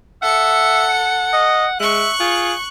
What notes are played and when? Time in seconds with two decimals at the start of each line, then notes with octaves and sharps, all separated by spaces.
0.23 A4 E5 F#5 C#7
1.33 D#5
1.80 G#3 E5 C#6 F#6
2.20 F4 G#4